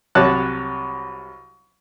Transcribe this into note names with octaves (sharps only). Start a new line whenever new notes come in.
C2 C3 F#3 C#5 A5 F#6